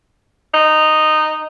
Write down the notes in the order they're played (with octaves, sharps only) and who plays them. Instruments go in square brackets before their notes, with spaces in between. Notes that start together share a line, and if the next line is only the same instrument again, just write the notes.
[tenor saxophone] D#4